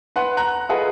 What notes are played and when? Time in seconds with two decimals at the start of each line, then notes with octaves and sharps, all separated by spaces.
0.16 B4 F#5 C6
0.37 A#5 F#6
0.69 F4 G#4 A4 B4 D#5 F#5